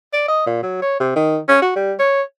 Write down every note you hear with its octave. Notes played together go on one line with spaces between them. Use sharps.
D5
D#5
A#2
F#3
C#5
C3
D#3
C#4
F#4
G3
C#5